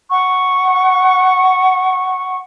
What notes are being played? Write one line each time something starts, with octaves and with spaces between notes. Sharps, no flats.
F#5 C#6